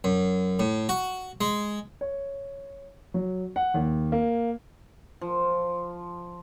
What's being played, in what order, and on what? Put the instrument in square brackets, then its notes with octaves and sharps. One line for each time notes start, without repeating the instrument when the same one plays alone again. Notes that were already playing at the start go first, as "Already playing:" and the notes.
[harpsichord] F#2
A2
F#4
G#3
[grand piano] C#5
F#3
F#5
D#2
A#3
[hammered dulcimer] F3